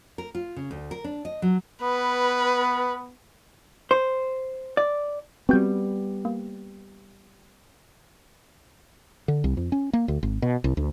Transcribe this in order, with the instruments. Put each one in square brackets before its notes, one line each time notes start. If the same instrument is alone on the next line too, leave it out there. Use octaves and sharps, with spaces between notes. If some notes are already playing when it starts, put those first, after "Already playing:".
[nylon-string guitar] A#4
F4
C#3
D2
A#4
D4
D#5
F#3
[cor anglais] B3 [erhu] B4
[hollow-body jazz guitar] C5
D5
[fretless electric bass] G3 B3 [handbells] C4 F#4 G6
[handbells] A#3
[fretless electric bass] D3
C2
F2
C#4
A#3
D2
G#1
B2
C2
D2